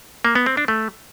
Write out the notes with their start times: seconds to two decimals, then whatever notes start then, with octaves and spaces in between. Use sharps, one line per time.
0.25 A#3
0.35 B3
0.46 C4
0.57 D4
0.68 A3